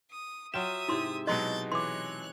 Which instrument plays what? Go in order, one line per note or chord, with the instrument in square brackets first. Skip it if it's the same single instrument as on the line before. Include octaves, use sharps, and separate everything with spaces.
[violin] D#6
[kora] F#3 F4 G5 [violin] E5 D#6 [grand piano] E7
[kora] G#2 C3 [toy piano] E4 C6
[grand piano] B2 F#3 G#3 [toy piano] D#5 C6 [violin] G6 A6
[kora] E3 [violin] C#5 F#6 [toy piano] C6 D6